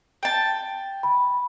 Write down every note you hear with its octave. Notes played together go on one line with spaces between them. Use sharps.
G5 A5
B5